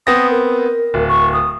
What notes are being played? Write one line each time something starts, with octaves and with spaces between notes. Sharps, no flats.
B3 C4 D#6 A#6
A#4
D1
C#6
D#6